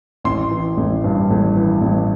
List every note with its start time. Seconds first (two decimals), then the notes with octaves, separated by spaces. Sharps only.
0.24 A1 C6
0.51 E3
0.77 A1
1.04 G2
1.30 A1
1.56 E3
1.82 A1